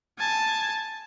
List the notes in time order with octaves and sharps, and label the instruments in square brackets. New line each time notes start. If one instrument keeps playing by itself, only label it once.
[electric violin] G#5 A5